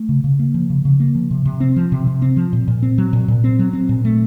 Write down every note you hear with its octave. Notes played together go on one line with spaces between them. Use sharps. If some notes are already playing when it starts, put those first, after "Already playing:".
Already playing: A3
C#3
C#3
A#3
F3
C#3
C#3
A#3
F3
C3
C3
C4
F3
C3
C3
C4
F3
A#2
A#2
C4
F#3
A#2
A#2
C4
F#3
C4
A#2
A3